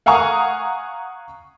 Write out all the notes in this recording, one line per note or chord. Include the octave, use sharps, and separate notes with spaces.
F5 F#5 G#5 A#5 C#6 D#6